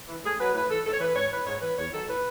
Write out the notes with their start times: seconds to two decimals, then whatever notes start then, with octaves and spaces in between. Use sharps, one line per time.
0.08 E3
0.23 A2 G#4
0.39 F#3 B4
0.54 A2 B4
0.69 E3 A4
0.85 G#2 A4
0.93 C#5
1.00 E3 B4
1.15 G#2 C#5
1.31 E3 B4
1.46 G#2 C#5
1.62 E3 B4
1.77 E2 C#5
1.92 D#3 F#3 A4
2.08 A2 B4